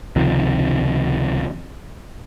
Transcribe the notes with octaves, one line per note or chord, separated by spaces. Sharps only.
C#2 C3 D#3 F3